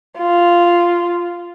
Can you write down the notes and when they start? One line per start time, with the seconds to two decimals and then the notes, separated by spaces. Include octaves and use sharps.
0.18 F4